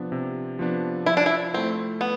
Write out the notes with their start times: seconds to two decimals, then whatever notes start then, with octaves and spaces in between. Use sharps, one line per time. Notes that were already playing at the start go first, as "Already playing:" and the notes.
Already playing: C3 F3 B3 D4
0.12 C3
0.59 F3 B3 D4
1.06 F3 E4
1.17 D4
1.26 E4
1.54 A3 C4 E4
2.01 B3